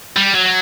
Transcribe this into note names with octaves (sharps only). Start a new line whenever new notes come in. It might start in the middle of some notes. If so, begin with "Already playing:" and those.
G3
F#3